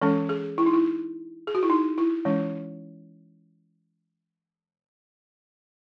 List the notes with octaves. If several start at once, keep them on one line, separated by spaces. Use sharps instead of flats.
E3 G#3 C#4 A4
G#4
E4
D#4
E4
G#4
F#4
E4
D#4
E4
E3 G#3 C#4